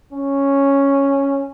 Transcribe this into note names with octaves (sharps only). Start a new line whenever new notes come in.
C#4